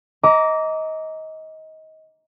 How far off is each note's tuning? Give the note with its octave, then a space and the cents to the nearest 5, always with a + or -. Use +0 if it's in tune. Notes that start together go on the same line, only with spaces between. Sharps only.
D#5 +25 A#5 +0 D6 -20